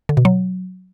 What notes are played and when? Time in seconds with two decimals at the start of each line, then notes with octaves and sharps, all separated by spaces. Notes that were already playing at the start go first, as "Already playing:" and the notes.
0.09 D3
0.17 B2
0.25 F#3